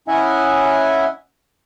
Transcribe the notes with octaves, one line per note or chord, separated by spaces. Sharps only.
C#4 E4 D#5 E5 F#5 G#5